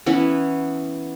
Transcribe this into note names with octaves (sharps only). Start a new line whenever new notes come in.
E3 B3 C#4